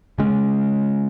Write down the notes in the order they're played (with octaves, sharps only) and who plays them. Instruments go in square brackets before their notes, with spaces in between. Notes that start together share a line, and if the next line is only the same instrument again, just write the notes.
[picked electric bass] C#3 G#3 C#4